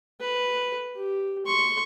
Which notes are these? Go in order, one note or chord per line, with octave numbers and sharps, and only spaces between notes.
B4
G4
C6 C#6